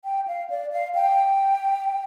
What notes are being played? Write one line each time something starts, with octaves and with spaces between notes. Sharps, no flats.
G5
F5
D5
F5
G5